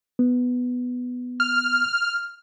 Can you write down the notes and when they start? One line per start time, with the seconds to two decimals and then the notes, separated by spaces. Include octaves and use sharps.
0.19 B3
1.40 F6